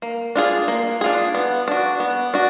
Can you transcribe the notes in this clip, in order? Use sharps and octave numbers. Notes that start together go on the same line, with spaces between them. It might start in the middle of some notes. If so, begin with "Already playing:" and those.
A#3
D4 F4 G#4
A#3
D4 F4 G#4
B3
D4 F#4
B3
D4 F#4